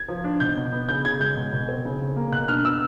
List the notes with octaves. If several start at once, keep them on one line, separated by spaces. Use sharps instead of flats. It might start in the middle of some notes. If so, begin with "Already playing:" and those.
Already playing: G#6
F3
D4
B2 G6
B2
B3
C#3 G6
C#3 G#6
G#3 G6
B2
B2
C4
C#3
C#3
A#3
B2 F#6
D4 F6
B3 E6